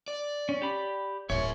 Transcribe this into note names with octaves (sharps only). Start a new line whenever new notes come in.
D5
C#4
G4 B5
D1 F4 A#4 C#5 E5